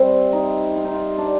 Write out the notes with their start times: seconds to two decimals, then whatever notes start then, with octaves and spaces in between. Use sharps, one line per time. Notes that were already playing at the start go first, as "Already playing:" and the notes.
Already playing: C3 G3 C4
0.33 D#4
0.76 F4
0.85 D#4
0.93 F4
1.18 D4